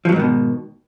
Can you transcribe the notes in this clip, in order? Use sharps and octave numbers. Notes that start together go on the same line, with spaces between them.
G#2 B2 D#3 F3 F#3